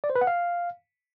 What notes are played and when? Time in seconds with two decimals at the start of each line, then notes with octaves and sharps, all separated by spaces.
0.04 D5
0.10 C5
0.15 B4
0.21 F#5
0.27 F5